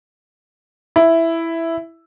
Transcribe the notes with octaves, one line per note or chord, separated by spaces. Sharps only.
E4